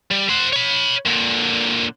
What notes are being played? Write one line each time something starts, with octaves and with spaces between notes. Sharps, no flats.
G3
C5 F#5
C#5 B5
A#2 D3